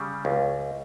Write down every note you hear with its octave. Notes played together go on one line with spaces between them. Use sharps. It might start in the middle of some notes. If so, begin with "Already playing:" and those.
Already playing: C#3 G3
C#2